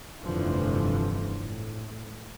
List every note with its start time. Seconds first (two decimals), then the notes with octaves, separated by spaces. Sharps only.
0.21 F1 G2 D3 E3 F3
1.38 A2